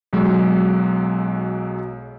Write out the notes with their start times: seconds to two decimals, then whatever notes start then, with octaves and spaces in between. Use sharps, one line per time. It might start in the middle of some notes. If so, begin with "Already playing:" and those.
0.13 B1 F#3 G#3